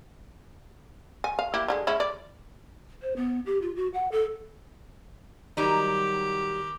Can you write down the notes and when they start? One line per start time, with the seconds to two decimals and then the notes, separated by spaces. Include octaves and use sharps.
1.24 G#5
1.39 F5
1.54 A#3 E4 G4
1.68 D3 G3 G#3
1.87 G#3 C#4 E4
2.00 D5
3.02 C5
3.16 B3
3.46 G4
3.62 F4
3.76 F#4
3.94 F#5
4.12 A4
5.57 D#3 F#3 G3 D#4 G4 A#5